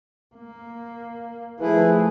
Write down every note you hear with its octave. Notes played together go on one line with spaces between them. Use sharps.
A#3
F3 A3 E4 G#4 B4